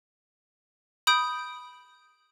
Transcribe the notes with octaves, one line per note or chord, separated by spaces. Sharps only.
B5 D#6 G6 D7